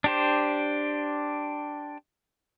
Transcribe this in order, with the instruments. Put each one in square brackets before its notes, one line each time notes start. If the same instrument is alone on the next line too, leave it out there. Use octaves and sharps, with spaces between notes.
[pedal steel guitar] D4 G4 C5